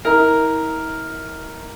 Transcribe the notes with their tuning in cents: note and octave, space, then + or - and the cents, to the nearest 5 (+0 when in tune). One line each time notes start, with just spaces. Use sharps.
E4 -45 A#4 +0